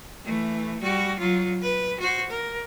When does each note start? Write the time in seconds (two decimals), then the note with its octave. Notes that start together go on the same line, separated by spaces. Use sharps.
0.25 E3 A3
0.81 G3 F#4
1.20 F#3 F4
1.62 B4
2.00 F#4 C5
2.30 A#4